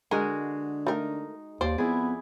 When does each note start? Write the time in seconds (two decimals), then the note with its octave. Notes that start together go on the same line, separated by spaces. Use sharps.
0.11 D3 G#3 F#4 G#4 A#4
0.87 A3 D#4 A#4
1.61 D#2 C5 D5
1.78 F2 B3 E4 G#4